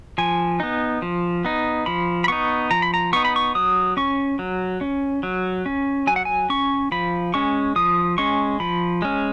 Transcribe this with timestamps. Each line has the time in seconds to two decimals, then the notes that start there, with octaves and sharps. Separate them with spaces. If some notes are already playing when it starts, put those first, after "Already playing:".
0.18 F3 G#5
0.60 B3 D#4
1.02 F3
1.45 B3 D#4
1.86 F3 B5
2.24 B5
2.28 B3 D#4 C#6
2.71 F3 A#5
2.82 B5
2.94 A#5
3.13 B3 D#4 C#6
3.25 B5
3.36 C#6
3.55 F#3 D#6
3.97 C#4 C#6
4.39 F#3
4.81 C#4
5.23 F#3
5.66 C#4
6.07 F#3 G#5
6.16 F#5
6.25 G#5
6.50 C#4 C#6
6.92 F3 B5
7.34 G#3 C#4 C#6
7.76 F3 D#6
8.18 G#3 C#4 C#6
8.60 F3 B5
9.02 G#3 C#4